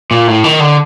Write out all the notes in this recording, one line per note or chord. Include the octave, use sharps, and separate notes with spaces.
A#2
A2
D#3
D3